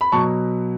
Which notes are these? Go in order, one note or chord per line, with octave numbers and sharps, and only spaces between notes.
B5
B2 F#3 A5 C#6